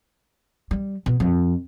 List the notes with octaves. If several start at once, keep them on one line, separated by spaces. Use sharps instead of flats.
G3
B2
F2